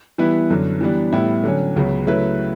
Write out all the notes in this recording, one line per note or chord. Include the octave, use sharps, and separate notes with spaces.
E3 G3 B3 E4 B4
F#2 D3 F#3
E3 G3 B3 D4
A2 G3 B3 E4
D3 F#3 C#4
C#2 C#3 F#3 B3
C#3 F#3 A3 E4 B4